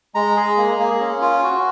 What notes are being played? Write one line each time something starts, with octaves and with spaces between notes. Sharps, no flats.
G#3 A#5
G#4
A#3
A#3
C#4
F4
F#4